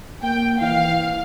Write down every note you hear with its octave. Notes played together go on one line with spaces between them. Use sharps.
A#3 G5
E3 F5